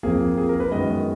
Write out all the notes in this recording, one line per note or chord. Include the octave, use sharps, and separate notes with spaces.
F2 F3 A#3 G#4
G#4
A#4
B4
F#2 D#3 G#3 B3 D#5